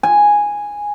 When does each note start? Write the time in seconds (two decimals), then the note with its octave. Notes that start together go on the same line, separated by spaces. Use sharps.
0.03 G#5